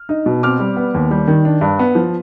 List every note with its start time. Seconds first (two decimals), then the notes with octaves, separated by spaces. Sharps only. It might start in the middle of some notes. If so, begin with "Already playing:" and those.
Already playing: F6
0.09 D#4
0.26 B2
0.43 C4 D6 F6
0.60 G3
0.77 B3
0.94 D#2
1.11 G3
1.28 D#3
1.45 D4
1.61 G2
1.79 B3
1.95 F3